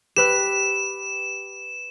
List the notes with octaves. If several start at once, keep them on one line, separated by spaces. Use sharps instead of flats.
G4 B4 E6 E7